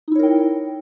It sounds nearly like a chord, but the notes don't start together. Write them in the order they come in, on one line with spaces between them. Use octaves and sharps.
D#4 E4 C#5 A#4 G5